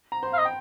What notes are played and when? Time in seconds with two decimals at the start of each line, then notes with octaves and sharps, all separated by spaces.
0.12 A#5
0.23 C5 C6
0.33 F5
0.38 D#5
0.45 G5